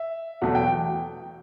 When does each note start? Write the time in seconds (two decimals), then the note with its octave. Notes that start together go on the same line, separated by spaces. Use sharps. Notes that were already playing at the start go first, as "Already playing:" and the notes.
Already playing: E5
0.41 E2 B2 F#3 A3 F#5
0.55 G5